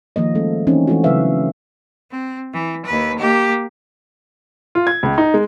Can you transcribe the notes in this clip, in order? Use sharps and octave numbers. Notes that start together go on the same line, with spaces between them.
D#3 F3 A#3 D#5
G#3 A3 C#4 A4
E3 C4 C#4 D#4
E3 G#3 A3 C4 E4 F#4
C#3 F#3 G#3 B4 E5 F5
C4
E3
D#2 B4
A#3 G4
F4
G#6
C#2
D#4
G#3